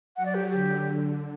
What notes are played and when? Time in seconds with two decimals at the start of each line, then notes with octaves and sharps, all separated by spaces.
0.17 F#3 F#5
0.26 D5
0.35 G4
0.51 D3 G4